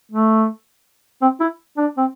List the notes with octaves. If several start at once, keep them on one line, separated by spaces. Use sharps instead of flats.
A3
C4
E4
D4
C4